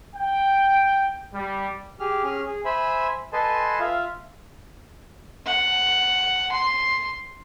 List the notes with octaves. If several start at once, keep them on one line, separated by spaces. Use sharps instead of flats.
G5
G3
G4 G#4 F6
C#4 G#4 F6
G#4
C5 E5 G#5 B5 E6
A4 B4 D#5 G#5 A5 C6
F4 E5 F5
F#5
C6